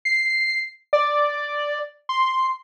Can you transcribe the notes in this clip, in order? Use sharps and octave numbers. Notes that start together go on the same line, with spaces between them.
C7
D5
C6